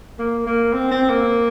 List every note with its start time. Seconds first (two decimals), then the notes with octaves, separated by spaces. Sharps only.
0.19 A#3
0.47 A#3
0.73 C4
0.91 C4
1.10 A#3